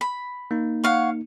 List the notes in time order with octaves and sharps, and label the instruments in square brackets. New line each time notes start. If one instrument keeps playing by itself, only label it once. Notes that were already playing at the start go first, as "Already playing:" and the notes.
[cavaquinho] B5
[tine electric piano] A#3 D#4
[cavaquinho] C#5 F5 F#5